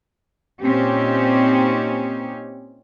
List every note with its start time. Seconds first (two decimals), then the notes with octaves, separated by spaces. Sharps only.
0.62 A#2 C4 C#4 D#4 G4